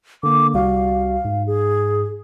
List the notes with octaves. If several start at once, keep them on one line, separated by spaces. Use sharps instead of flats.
D3 A#3 D6
C2 G3 F#4 F5
G#2
G#4